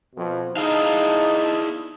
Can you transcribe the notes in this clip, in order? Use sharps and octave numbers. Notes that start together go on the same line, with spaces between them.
F2 B2
D#4 E4 G#4 F5 A5